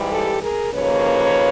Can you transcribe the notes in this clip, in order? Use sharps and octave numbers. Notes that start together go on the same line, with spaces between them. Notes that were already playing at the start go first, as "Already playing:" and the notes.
Already playing: G#2 E3 G3
G4 A4
G#4 A#4
D#2 C#3 F3 A#3 B4 C#5